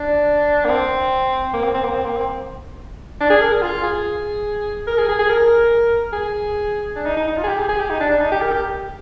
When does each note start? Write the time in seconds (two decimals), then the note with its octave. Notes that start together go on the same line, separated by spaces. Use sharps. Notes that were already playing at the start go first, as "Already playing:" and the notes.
Already playing: D4
0.65 A#3
0.70 C4
1.54 A#3
1.64 C4
1.74 C4
1.85 A#3
1.95 C4
2.05 A#3
2.16 C4
3.20 D4
3.30 G#4
3.41 A#4
3.52 G#4
3.62 F4
3.83 G#4
4.87 A#4
4.98 G#4
5.09 G#4
5.19 G#4
5.29 A#4
6.13 G#4
6.96 D4
7.06 D#4
7.17 D#4
7.28 D#4
7.38 F4
7.44 G#4
7.48 G4
7.59 G#4
7.69 G#4
7.80 G4
7.90 D#4
8.00 D4
8.11 D4
8.21 D#4
8.32 G4
8.42 A#4
8.53 G4